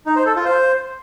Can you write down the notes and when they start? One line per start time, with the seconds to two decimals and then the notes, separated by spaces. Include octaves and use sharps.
0.06 D#4
0.16 C5
0.26 A4
0.36 F4
0.45 C5